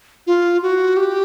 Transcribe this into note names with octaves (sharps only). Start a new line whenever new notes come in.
F4
F#4
G4